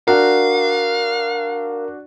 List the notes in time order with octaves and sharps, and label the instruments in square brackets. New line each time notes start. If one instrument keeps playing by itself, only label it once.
[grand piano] D4 F#4 [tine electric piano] A#4 [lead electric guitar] F5